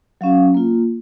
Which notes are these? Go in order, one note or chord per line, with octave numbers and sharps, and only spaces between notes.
F#3 C#4 F#4 F5
A#3 F4